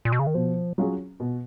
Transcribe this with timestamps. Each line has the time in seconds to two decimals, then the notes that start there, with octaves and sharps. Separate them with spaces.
0.05 A#2
0.12 B2
0.19 C#3
0.27 D#3
0.34 B2 F3
0.78 F#3 C#4 F4 G#4
1.20 B2